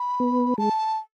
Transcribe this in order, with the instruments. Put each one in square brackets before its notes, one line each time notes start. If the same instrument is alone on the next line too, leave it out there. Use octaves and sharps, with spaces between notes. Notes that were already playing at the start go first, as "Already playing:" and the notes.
Already playing: [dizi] B5
[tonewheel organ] B3
[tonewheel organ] G#3 [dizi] A5